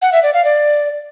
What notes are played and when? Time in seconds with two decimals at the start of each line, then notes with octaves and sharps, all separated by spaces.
0.02 F#5
0.13 E5
0.23 D5
0.34 F5
0.44 D5